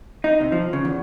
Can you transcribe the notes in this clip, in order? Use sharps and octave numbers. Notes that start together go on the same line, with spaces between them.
D#4
C3
F3
C#3
E2